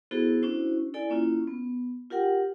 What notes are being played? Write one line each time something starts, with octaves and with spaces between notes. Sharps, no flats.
B3 E4 F#4 G#4 A4 C5
C#4 D4 E4 F#4 C5
E4 A4 D5 G#5
A#3 C#4 E4 F4
B3
F4 G4 A#4 F#5 G5